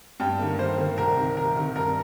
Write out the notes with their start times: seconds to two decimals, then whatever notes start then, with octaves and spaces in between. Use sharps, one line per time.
0.20 G2 G5
0.39 D#3 A#3
0.59 G2 C5
0.78 D#3 A#3
0.97 C2 A#4
1.17 C3 D#3
1.37 C2 A#4
1.56 C3 D#3
1.76 G2 A#4